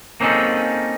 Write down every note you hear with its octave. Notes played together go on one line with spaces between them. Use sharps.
A#3 C4 C#4 D#4 G#4 A4